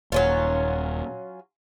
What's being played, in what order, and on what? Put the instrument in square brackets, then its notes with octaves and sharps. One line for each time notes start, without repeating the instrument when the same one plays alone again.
[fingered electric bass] D#1 [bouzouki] F#3 C#4 F4